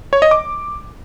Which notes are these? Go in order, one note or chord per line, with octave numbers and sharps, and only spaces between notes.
C#5
D#5
D6